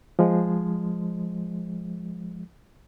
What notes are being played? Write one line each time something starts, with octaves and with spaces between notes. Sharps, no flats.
F3 G#3